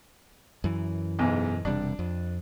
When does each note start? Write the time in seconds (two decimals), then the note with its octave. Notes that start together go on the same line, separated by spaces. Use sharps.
0.64 F#2 E3
1.19 B1 E2 G#2
1.65 E1 C3 G3 D4
1.99 F2